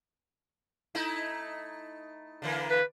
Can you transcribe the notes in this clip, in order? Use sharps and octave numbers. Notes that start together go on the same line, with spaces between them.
A3 D#4 E4
D3 E3 A#3
B4